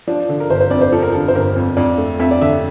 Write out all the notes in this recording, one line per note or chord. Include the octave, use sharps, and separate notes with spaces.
F3 D4
D3
A#4
G1 C5
C5
F2 D5
C5
F3 A4
A#4
D3 A4
C5
G1 A#4
F2
F2 D5
A3
F2 E5
D5
D3 E5